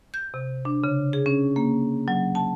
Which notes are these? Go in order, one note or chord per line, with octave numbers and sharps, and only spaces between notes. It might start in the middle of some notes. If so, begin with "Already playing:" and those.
G6
C3
D4
C#3
G#4
C#4
A#3
F#3
A5